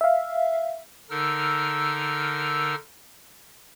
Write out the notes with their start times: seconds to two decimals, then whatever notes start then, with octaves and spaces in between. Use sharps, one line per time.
0.01 E5 F5
1.10 D3 D#4 A#4 E6 F6